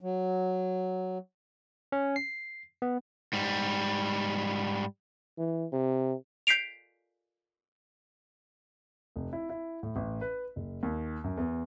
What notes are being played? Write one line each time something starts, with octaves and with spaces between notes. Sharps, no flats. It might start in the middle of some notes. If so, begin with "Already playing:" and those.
F#3
C#4
C7
B3
G#2 G3
E3
C3
G6 B6 C7 D7 F7
F1
E4
E4
A2
A1
B4
F#1
D#2
F#2
E2